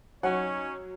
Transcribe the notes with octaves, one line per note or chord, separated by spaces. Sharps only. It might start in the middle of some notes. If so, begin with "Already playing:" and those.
F#3 C#4 D#4 C#5 F#5